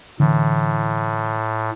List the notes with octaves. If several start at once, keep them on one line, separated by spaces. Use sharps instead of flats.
A2 D3 E3